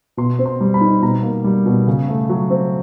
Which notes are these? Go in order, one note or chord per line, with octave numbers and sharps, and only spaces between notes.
B2 C6
C4
C6
G3
B5
D#4
B2 A#5
A#3
G3
B2
C#3
A3
F#3
C4